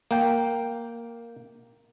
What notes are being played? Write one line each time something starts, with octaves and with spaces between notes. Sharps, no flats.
A#3 G5